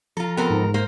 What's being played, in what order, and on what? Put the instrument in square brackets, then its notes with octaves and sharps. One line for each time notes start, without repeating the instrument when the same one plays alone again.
[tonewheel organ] F3 A#5 [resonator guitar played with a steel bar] F4 A4
[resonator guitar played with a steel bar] B3 C4 A4 [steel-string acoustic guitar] A#4
[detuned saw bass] G#2
[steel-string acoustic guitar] A#3 [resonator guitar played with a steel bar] C5